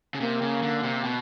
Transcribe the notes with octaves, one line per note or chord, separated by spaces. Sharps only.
C#3
C3 A#3
C#3
D3
C3
B2